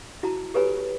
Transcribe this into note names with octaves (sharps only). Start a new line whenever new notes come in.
E4 F#4 A5 A#5
G4 A4 B4 C#5 G#5 B5